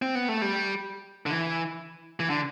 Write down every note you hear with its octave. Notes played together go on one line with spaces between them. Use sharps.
C4
B3
A3
G3
D3
E3
E3
D3